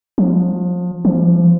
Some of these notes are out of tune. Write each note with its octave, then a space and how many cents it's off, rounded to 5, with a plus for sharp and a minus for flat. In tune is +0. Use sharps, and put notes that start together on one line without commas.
F3 +30
F3 -25